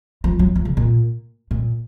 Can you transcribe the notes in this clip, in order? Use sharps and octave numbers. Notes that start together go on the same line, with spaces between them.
F3
F#3
F3
C#3
A#2
A#2